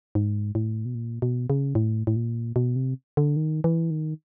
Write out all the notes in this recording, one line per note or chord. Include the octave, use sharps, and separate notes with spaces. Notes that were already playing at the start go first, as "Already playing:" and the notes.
G#2
A2
B2
A#2
B2
C#3
A2
A2
A#2
B2
C3
D3
D#3
E3
D#3